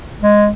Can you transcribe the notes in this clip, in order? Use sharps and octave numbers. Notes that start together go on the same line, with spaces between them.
G#3